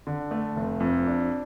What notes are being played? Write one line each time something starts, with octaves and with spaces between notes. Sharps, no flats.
D3
A3
F1
F2
D4